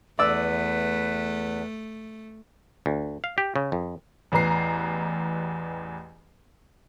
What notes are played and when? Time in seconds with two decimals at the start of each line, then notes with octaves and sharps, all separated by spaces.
0.19 E2 A3 B4 D5 E6
2.86 D2
3.24 F5
3.38 G4
3.56 C#3
3.72 F2
4.32 A1 E2 B4 A#5 C7